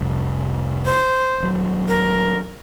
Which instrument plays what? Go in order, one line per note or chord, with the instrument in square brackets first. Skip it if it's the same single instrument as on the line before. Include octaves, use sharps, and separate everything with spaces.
[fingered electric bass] F1 C2
[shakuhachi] C5
[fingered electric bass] D#1 F#3
[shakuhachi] A#4